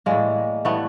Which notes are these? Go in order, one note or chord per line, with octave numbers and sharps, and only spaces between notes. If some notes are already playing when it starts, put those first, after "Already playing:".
A2 E3 G3 G#3 A#3
A2 E3 G3 A3 B3